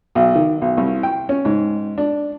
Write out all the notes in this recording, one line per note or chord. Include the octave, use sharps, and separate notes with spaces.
B1
D#3
B1
C2
G5
C#4
G#2
D4